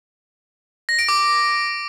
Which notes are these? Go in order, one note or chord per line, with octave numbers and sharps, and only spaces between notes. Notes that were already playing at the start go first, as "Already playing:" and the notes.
A#6
D7
D6